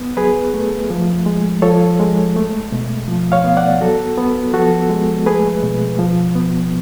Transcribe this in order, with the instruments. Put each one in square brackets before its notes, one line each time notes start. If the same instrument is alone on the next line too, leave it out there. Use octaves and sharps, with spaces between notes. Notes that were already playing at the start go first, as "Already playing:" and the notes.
Already playing: [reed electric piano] B3
F#3 G#4 B4
A3
F3
G#3
F3 A4 C#5
G#3
A3
B2
F3
C#5 F5
B3
D5 F#5
F#3 F#4 A4
B3
F3 F#4 A4
G#3
A3 G#4 B4
B2
F3
B3